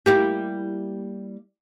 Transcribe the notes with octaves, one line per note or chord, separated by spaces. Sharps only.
G3 A#3 E4 G4